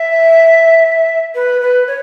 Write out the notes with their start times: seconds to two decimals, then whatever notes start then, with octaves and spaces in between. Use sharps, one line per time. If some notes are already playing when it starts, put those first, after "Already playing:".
Already playing: E5
1.35 B4
1.61 B4
1.87 C#5